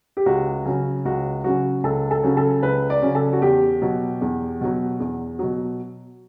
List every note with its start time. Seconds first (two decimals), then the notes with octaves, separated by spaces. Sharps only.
0.17 G4
0.26 C#2 F#4
0.66 C#3 F#3 C#4
1.05 C#2 F#4
1.44 C#3 F#3 C#4 F#4
1.84 C#2 A4
2.11 A4
2.24 C#3 F#3 C#4
2.37 A4
2.63 C#2 B4
2.90 D5
3.02 C#3 F#3 C#4
3.15 A4
3.33 F#4
3.42 E2 G4
3.82 B2 F#3
4.21 E2
4.61 B2 F#3
5.00 E2
5.39 B2 F#3